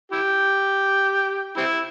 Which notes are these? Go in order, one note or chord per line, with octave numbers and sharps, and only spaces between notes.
E4 G4
G3 C4 E4